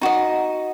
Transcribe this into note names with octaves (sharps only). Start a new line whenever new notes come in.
D#4 F#4 D#5